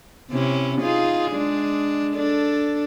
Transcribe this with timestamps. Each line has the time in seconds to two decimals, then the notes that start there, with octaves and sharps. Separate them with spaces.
0.31 C3 C#4 E4
0.81 D#4 F4 G#4
1.31 G#3 D4
2.14 D4 A4